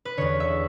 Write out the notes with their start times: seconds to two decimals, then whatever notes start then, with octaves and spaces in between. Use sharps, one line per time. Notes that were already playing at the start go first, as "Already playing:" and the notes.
0.05 B4
0.17 E2 D3 C#5
0.40 E5